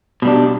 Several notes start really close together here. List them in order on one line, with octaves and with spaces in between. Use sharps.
B2 G3 D4